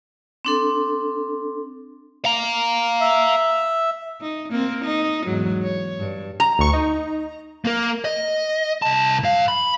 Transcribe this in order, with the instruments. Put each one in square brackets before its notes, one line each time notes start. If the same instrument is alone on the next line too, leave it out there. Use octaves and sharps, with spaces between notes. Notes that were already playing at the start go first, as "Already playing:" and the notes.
[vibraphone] C4 D4 A4
[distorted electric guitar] F5 A#5
[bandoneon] E5
[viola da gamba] D#4
A#3 C4 A#4
D#4
E2 G#2 F#3
C#5
G2
[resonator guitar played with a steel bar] A#5
[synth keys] D2 C#6
D#4
[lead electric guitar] A#3 A#4
D#5
C2 A5
G2 F5
B5